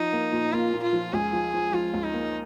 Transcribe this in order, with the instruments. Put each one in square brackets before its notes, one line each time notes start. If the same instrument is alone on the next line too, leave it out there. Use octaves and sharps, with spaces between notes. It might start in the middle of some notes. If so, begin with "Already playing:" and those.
Already playing: [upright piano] F3 [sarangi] D#4
[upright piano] A#3
A#2
[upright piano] A#3 [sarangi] F4
[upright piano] A#2
[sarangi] F4
[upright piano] F3
[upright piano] C#2 [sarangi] G#4
[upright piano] F3
F3
[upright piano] F3 [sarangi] F4
[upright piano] C#2
[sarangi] D#4
[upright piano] A#3